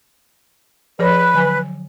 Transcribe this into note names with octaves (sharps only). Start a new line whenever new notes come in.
F3 G#4 B4 C#5
D3 F#3 G#5